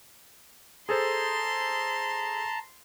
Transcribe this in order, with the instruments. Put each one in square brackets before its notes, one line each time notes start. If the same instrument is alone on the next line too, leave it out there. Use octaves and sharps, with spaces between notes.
[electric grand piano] G#4 A4 C5 [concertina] A5 A#5 [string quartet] C6